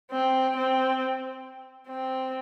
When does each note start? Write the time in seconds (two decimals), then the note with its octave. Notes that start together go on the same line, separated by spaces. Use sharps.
0.12 C4
0.56 C4
1.88 C4